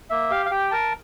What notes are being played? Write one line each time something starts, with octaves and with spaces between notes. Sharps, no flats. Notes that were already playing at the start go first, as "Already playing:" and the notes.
A#3 E5
G4 F5
F5
G4 G5
A#4 A5